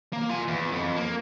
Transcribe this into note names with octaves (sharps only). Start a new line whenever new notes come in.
A#3
F4 G#5
E2
F2
A#3